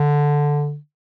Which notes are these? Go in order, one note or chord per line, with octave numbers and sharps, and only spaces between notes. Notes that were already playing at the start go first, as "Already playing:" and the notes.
Already playing: D3